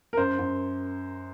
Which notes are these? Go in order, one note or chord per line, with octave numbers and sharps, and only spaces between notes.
A#4
F#2 C5
F#2